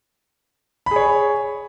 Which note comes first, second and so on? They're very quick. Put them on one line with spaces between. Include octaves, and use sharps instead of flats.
B5 G#4 C#5